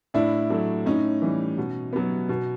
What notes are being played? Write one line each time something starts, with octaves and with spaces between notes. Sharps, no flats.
A2 D4 E4
F#3 A3
A2 C#4 D#4
E3 G3
B2
F#3 B3
B2